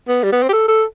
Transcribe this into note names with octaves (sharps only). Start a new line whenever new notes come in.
B3
G3
B3
C4
G4
A4
A4